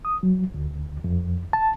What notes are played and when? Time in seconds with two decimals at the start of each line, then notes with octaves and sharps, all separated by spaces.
0.05 D#6
0.23 F#3
0.54 D2
1.04 F2
1.53 A5